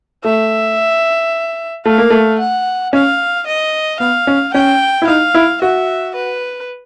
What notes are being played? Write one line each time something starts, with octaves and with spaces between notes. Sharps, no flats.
A3 E5
A3 F5
A#3
A3
F#5
C#4 F5
D#5
B3 F5
C#4
C#4 G5
E4
D#4 F5
E4
F#4 E5
B4